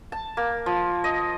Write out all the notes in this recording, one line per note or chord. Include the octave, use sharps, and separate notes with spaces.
A5
A#3
F3
D#5